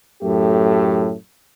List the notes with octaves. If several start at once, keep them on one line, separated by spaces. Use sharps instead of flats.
F#2 A2 A3 G4